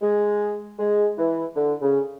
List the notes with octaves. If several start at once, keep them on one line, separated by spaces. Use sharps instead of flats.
G#3
G#3
E3
D3
C#3